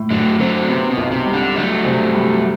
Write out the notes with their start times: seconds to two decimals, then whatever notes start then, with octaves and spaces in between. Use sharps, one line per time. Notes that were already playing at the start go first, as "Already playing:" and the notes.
Already playing: A2
0.10 A2 D3 F#3
0.39 D3 F#3 C4
0.68 C3 B3
0.91 B2
0.97 B1
1.11 C3
1.26 G3
1.33 D3
1.56 F#3 A3 D4
1.85 C3
2.13 G3